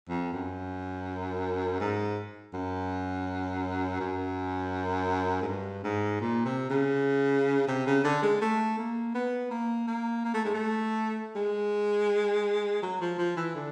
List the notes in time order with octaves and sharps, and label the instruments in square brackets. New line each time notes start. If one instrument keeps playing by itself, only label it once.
[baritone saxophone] F2
F#2
G#2
F#2
F#2
G#2
G2
G#2
A#2
C3
C#3
C3
C#3
D3
G#3
A3
A#3
B3
A#3
A#3
A#3
A3
G#3
A3
G#3
F#3
F3
F3
E3
D3